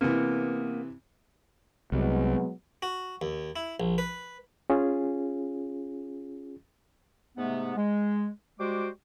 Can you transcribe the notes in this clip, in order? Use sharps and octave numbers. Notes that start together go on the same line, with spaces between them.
C3 E3 A#3 B3
C2 F#3 G#3 B3
F#4
D#2
E4
A#1
B4
C#4 F4 G#4
G#2 C3 A3 B3
G#3
G3 G#3 F#4 C5 D6